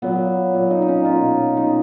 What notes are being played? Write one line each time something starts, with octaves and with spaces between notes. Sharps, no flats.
A#2 F#3 A#3 B3
A#2 F#3 A#3
D#4
D#4
C#4
B2 A#3 F4
B2 A#3 D#4